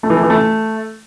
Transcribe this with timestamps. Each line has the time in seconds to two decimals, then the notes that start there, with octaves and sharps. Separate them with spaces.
0.03 A3
0.10 E3
0.17 A3
0.23 E3
0.30 A3